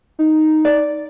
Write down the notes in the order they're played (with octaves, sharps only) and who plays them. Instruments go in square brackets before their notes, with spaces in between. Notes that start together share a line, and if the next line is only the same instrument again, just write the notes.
[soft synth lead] D#4
[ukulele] D5